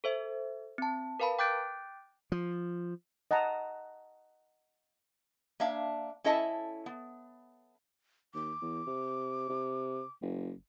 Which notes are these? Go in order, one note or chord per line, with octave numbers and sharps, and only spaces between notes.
A4 C5 E5
C4 A5
A#4 B4 F5 A5 B5
G5 D6 F#6 G6 A6 D7
F3
D#5 F#5 A5 A#5
A#3 D4 E5 F5
C#4 E4 A4 D#5 E5 A5
B3
D#2 D6
E2
C3
C3
F#1